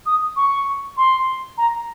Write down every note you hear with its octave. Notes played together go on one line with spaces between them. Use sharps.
D#6
C#6
C6
A#5